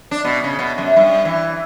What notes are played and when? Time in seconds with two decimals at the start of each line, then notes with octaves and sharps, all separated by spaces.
0.11 D4
0.25 B2
0.44 C#3
0.59 B2
0.78 F#2
0.96 G2
1.25 E3